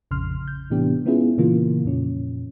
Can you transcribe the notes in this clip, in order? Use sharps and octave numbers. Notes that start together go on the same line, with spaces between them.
A#1 F2 C#3 C6 F6
G6
A2 C3 E3 B3 D4 G4
G#3 B3 C#4 E4 F4 G#4
A#2 C#3 E3 A#3 F4
F2 A#2 C#4